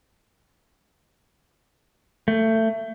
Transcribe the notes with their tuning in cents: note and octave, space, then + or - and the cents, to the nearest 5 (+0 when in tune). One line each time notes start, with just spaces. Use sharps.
A3 +20